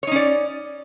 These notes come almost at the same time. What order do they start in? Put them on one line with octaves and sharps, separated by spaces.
C#5 D#4 C#4 D5